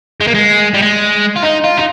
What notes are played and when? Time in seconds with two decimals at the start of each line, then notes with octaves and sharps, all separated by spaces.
0.21 G#3
0.27 A#3
0.34 G#3
0.74 G3
0.82 G#3
1.36 F4
1.43 D#4
1.64 F4
1.77 D#4